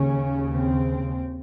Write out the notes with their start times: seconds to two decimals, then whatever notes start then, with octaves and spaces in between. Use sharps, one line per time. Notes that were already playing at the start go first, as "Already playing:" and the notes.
Already playing: D#2 C#3 C#4
0.52 C4